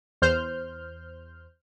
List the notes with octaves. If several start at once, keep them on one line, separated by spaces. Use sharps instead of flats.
E2 C5 F6 G6